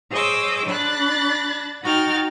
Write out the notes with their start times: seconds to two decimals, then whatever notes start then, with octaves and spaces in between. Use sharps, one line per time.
0.11 G#4 C5 C#5 D#5 D6 E6
0.67 D4 B5 F#6 A6
1.84 D#4 F#4 F#5 G5 F6 A6